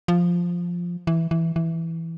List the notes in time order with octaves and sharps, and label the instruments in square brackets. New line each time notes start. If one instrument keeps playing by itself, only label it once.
[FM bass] F3
E3
E3
E3